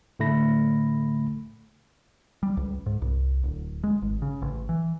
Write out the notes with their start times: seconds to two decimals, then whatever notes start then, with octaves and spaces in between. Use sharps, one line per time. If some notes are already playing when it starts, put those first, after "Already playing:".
0.19 A2 D3 A3 B5 A#6
2.43 G3
2.57 C#2
2.86 G#2
3.02 C2
3.44 D1
3.84 G#3
4.02 G#1
4.22 C#3
4.42 A1
4.69 E3